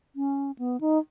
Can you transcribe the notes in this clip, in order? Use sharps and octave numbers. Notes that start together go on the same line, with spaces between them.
C#4
B3
D#4